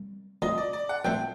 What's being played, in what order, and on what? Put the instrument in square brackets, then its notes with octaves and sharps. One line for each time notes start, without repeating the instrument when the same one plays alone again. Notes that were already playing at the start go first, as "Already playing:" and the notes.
Already playing: [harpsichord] C2
[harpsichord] D2 C3 F3 [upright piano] D#5
[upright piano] D5
D5
F#5
[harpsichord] A#1 A#2 F3 A3 C4 [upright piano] G5